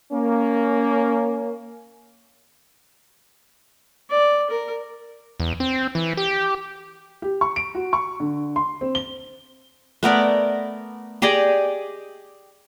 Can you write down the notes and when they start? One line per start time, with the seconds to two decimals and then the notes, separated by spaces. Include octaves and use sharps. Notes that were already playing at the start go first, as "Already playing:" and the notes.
0.12 A#3 C#4
4.10 D5
4.50 A#4
5.40 E2
5.60 C4
5.95 E3
6.17 G4
7.22 G4
7.41 C#6
7.56 D7
7.75 F#4
7.93 C#6
8.20 D3
8.56 C6
8.81 C4
8.95 G7
10.03 A3 B3 A#4 D5
11.22 G4 G#4 D5 D#5